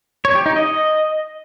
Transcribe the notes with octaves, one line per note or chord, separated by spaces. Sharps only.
C#5
G4
D#4
D#5